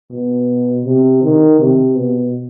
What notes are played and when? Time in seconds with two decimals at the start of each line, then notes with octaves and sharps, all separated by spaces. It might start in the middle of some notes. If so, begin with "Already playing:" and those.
0.11 B2
0.86 C3
1.23 D#3
1.60 C3
1.96 B2